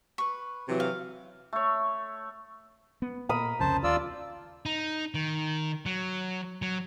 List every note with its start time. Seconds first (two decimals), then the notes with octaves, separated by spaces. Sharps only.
0.18 B4 C#6
0.68 C3 E3 F#3
0.80 F5
1.53 A3 C#5
3.02 B3
3.29 A#2 A#4 B5 D#6
3.60 C2 F2 C#3 C5 A5
3.84 D#2 F4 D5 E6
4.66 D#4
5.14 D#3
5.86 F#3
6.62 F#3